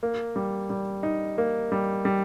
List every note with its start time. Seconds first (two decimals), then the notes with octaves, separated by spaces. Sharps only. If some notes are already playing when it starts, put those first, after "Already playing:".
0.03 A#3
0.36 G3
0.70 G3
1.03 D#4
1.38 A#3
1.72 G3
2.05 G3